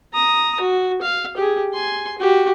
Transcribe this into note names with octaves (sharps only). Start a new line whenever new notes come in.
A#5 D#6
F#4
F5
G4 G#4
G#5 C6
F#4 G4